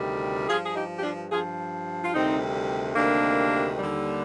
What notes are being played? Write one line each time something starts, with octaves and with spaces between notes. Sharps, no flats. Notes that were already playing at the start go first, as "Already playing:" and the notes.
Already playing: D2 C3 D#3 G3
G2 F3 F4 G#4
G#4
D#4 G4
G4
D4 F4
G2 F3 F4 G#4
F4
D2 C3 D#3 G3 C4 D#4
D2 C3 D#3 G3 A#3 D4
D#2 D3 G3